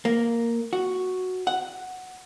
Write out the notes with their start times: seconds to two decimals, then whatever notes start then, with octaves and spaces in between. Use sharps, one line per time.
0.05 A#3
0.73 F#4
1.47 F#5